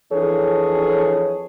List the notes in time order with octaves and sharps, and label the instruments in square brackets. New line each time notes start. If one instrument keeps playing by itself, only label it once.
[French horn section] F2 E3 D4 G#4 A4 C#5